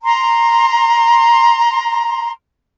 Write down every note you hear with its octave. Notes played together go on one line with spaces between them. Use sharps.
A#5 C6